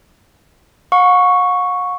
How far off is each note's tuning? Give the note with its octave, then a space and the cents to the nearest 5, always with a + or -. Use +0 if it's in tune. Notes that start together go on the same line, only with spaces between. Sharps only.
F#5 -45 C#6 +0